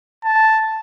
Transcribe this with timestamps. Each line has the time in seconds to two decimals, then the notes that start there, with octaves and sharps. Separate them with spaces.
0.24 A5